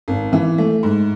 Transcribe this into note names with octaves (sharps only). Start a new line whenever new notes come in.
G#1
E3
A3
G#2